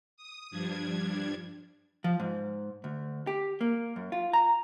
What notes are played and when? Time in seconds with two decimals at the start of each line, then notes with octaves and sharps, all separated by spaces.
0.17 D#6
0.51 G2 F3 G3 D4 G#6
2.04 F3
2.20 G#2
2.84 D2
3.27 G4
3.61 A#3
3.96 F#2
4.12 F4
4.33 A#5